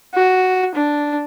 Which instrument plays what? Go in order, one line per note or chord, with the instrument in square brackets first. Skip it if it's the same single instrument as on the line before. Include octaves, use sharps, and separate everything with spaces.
[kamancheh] F#4
D4